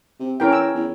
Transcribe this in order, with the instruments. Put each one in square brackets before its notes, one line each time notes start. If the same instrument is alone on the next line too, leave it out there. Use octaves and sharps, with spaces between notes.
[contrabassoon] C3
[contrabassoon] E3 [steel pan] C#4 A#4 G5
[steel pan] E6
[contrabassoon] E2